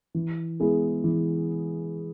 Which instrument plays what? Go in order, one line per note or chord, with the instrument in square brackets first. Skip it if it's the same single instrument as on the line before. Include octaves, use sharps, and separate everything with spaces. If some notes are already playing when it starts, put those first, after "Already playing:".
[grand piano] E3
G#3 B3 E4 G#4
E3